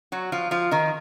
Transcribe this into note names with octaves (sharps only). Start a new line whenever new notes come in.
F#3 F#4
F3 F4
F3 F4
D#3 D#4